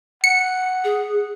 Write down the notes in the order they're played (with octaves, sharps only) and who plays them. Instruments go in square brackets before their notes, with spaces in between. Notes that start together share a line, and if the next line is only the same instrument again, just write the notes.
[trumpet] F#5 [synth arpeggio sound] C#7
[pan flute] G#4